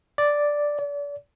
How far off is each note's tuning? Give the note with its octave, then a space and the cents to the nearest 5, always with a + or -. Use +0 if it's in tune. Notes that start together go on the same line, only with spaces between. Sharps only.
D5 +0
D5 -35